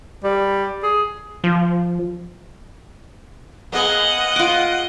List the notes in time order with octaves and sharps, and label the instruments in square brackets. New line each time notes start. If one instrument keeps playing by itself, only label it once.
[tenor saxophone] G3
G#4
[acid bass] F3
[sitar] A#3 B3 G#4 [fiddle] D#5 [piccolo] F#5
[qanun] F4 D6